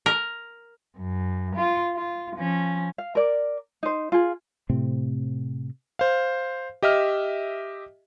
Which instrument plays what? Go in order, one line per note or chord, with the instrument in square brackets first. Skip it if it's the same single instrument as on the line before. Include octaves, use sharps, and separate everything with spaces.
[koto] A#4
[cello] F#2
F4
F4
F3 C#4
[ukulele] F5
A#4 D5
D#4 C5
F4 G#4
[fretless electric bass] A2 C3 A3 C4
[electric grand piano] C5 F5
G4 D#5 E5 F6